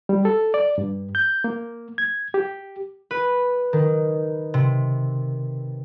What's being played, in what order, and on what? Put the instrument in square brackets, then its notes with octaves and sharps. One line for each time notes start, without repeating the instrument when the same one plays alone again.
[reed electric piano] G3
A4
D5
G2
G6
A#3
G#6
G4
[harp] B4
D#3
C3